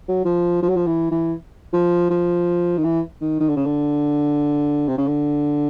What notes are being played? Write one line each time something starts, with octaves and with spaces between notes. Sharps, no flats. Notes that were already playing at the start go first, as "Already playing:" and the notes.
F#3
F3
F3
F#3
F3
E3
E3
F3
F3
D#3
E3
D#3
D#3
D3
C#3
D3
C3
C#3
D3